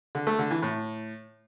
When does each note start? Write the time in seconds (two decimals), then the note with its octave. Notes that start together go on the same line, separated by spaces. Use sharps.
0.15 D3
0.27 A3
0.39 D3
0.51 E3
0.63 A2